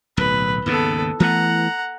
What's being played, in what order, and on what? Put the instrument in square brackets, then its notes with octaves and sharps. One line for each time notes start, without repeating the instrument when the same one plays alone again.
[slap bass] D1 B1 [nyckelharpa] B4
[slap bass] D#2 G#2 C#3 [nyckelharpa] B3 A4
[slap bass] E3 A3 B3 [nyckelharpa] F#5 A#5